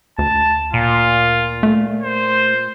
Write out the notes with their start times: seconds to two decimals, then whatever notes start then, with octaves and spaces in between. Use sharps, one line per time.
0.19 D2 A5
0.74 A#2 F4
1.63 A3
2.03 C5